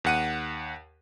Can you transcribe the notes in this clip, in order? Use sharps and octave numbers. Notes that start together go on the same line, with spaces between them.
D#2 F#5 D#7